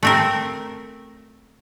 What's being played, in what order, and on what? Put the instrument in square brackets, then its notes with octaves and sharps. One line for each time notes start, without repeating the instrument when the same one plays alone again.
[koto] A3 C4 A#4